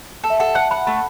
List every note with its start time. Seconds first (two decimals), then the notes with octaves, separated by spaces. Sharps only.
0.24 A4
0.30 E5
0.40 A4 F#5
0.55 F#5 A5
0.71 F#5 B5
0.87 A3 B5